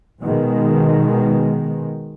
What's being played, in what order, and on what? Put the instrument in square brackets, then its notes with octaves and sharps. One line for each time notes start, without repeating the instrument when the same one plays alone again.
[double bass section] B2 D#3 G#3